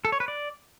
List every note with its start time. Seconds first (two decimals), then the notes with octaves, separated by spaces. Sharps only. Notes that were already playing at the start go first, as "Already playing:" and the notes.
0.05 A4
0.12 C#5
0.20 B4
0.28 D5